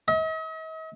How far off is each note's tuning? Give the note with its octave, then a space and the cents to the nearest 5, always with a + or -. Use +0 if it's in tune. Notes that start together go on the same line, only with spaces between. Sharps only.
D#5 +45